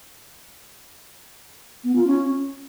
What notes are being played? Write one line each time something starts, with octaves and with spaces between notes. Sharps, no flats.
B3
F4
C#4